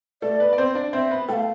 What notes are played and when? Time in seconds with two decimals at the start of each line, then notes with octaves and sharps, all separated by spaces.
0.22 A3 A4 D5
0.40 B3 B4
0.53 D5
0.58 C4 C5
0.75 D4 D5
0.93 C4 C5 E5
1.11 B3 B4
1.28 A3 A4 F5 G5